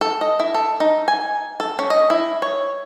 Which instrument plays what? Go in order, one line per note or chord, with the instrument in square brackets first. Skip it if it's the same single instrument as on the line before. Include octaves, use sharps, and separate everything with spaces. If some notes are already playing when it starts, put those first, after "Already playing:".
[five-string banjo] A4
D#5
E4
A4
D#4
G#5
A4
C#4
D#5
E4
C#5